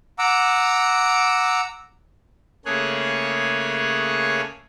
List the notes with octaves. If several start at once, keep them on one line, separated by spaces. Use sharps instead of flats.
F#5 A#5 D6 E6
C#3 A3 A#3 G#4 C#5 F#6